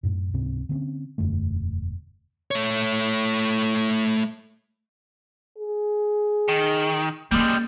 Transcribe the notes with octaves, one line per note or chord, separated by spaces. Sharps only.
F#2 A2
C#2 G#2 C3 C4
D3 A#3 C4 C#4
E1 F#2 D3 A3
A3 C#5
G#4
D#3
G3 G#3 A#3 C#4